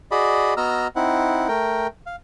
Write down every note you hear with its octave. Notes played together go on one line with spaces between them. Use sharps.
F#4 G#4 D5 D#5 B5
B3 F#4 D#5 A#5 E6 F6
C4 D#4 E4 F#5
A3 A#4 G5
F5